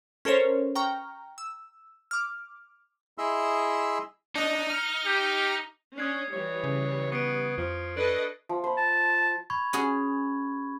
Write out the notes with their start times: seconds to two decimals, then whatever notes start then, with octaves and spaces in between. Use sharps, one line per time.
0.25 C#4 A4 A#4 C5 C#5
0.75 G5 A#5 C#6 F6
1.38 E6
2.11 D6 F6
3.18 E4 G#4 D#5 E5 C6 E6
4.36 D4 D#4 D#5
4.70 F6
5.06 G4
5.98 C#4 D4 D#6 G#6 C7
6.33 E3 G3 C#5
6.64 C#3
7.11 B3 C#6 C7 D7
7.58 F2 F3
7.97 D4 A4 B4 D#5 D7
8.49 F3
8.64 C5 B5
8.77 A5
9.50 B5 C#6 G#6
9.73 C#4 F#4 G#4